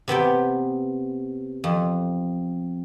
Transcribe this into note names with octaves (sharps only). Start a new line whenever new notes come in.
C3 B3 G4 G5
F2